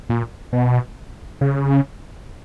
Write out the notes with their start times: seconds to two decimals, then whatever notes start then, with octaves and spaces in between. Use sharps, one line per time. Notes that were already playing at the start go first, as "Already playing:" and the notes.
0.09 A#2
0.53 B2
1.41 C#3